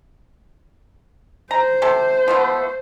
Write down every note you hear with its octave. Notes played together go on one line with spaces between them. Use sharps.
C5 A#5
C3 G4 A4
F3 A3 B3